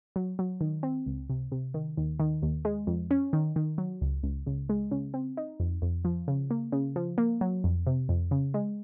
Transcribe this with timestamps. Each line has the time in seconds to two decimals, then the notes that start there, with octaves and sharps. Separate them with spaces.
0.16 F#3
0.39 F#3
0.61 D#3
0.83 C4
1.06 C#2
1.30 C3
1.52 C3
1.74 D#3
1.97 D#2
2.20 D#3
2.42 D#2
2.65 G#3
2.87 F2
3.11 C#4
3.33 D#3
3.56 D#3
3.78 F#3
4.01 C#2
4.23 C#2
4.46 C#2
4.69 G#3
4.91 C#3
5.14 C4
5.37 D#4
5.60 F2
5.82 F2
6.05 F3
6.28 C#3
6.50 A#3
6.72 C#3
6.96 F3
7.18 A#3
7.41 F#3
7.64 F2
7.86 C3
8.09 F2
8.31 C#3
8.54 G#3